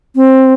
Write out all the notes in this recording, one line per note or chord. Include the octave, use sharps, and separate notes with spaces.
C4